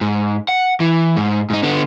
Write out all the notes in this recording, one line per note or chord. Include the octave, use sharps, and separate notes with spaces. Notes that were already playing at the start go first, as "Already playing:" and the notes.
G#2
F#5
E3
G#2
G#2 D#4
D3 B3